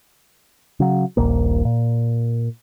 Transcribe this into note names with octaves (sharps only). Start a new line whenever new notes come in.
C#3 F#3
D#1 A#1 A#3
A#2